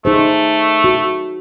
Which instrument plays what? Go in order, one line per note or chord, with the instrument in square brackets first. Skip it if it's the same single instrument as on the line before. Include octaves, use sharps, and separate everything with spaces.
[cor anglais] A3 [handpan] D#4 G#4 C5
[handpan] F#4